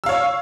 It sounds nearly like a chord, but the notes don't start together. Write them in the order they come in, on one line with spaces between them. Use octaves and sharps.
E6 F5 C#5